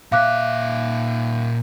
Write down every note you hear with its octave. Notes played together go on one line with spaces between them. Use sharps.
A#2 E5 F5 D6 F#6